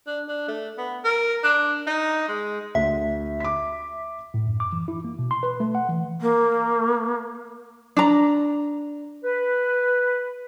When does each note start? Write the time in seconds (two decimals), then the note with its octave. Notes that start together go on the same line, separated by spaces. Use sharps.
0.07 D4
0.28 D4
0.48 A3
0.78 B3
1.04 A#4
1.44 D4
1.86 D#4
2.28 G#3
2.75 D2 E5
3.40 D6 B6
4.34 A2
4.47 F#2
4.60 D6
4.73 E3
4.88 E4
5.05 A#3
5.19 B2
5.31 C6
5.43 B4
5.60 A3
5.75 F#5
5.89 E3
6.21 A#3
7.97 D4 A#5
9.24 B4